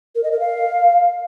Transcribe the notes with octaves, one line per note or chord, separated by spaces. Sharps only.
A#4
D#5
A#4
F5